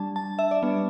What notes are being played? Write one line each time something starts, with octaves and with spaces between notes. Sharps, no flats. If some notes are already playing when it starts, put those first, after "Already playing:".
Already playing: G3 D4 A5
A5
E5
D5
G3 B3 D4